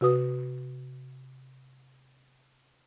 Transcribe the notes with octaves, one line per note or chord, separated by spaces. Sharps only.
C3 F#4 B4 D#6